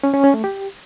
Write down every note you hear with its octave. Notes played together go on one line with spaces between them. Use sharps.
C#4
C#4
C#4
A3
G4